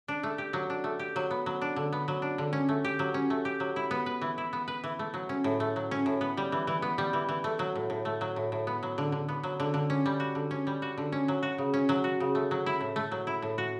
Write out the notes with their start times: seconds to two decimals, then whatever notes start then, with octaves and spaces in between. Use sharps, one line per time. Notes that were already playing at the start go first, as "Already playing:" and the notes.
0.08 D4
0.23 A3
0.38 G4
0.53 F#3
0.70 D4
0.84 A3
0.99 G4
1.16 F#3
1.31 B3
1.46 F#3
1.61 D4
1.76 D3
1.93 B3
2.08 F#3
2.22 D4
2.38 D3
2.53 C#4
2.69 A3
2.85 G4
2.99 F#3
3.14 C#4
3.30 A3
3.45 G4
3.60 F#3
3.76 E4
3.91 B3
4.06 B4
4.22 E3
4.38 E4
4.53 B3
4.68 B4
4.84 E3
4.99 A3
5.14 F#3
5.29 C#4
5.44 A2
5.60 A3
5.76 F#3
5.91 C#4
6.06 A2
6.21 B3
6.37 G3
6.52 E3
6.67 E3
6.82 B3
6.98 G3
7.13 E3
7.29 E3
7.44 A3
7.59 F#3
7.75 A2
7.90 A2
8.05 A3
8.21 F#3
8.36 A2
8.52 A2
8.67 B3
8.83 F#3
8.98 D3
9.12 D3
9.29 B3
9.43 F#3
9.60 D3
9.74 D3
9.90 C#4
10.06 G3
10.20 F#4
10.35 D3
10.51 C#4
10.67 G3
10.82 F#4
10.98 D3
11.12 C#4
11.28 F#3
11.43 F#4
11.58 C#3
11.74 C#4
11.89 F#3
12.04 F#4
12.20 C#3
12.35 A3
12.51 F#3
12.66 E4
12.81 A2
12.96 A3
13.12 F#3
13.27 E4
13.42 A2
13.58 F#4